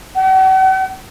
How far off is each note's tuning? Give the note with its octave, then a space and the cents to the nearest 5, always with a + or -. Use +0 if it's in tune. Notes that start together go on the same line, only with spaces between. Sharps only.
F#5 +40